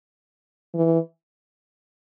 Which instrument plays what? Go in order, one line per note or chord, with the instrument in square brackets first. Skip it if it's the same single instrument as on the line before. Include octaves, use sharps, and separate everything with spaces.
[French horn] E3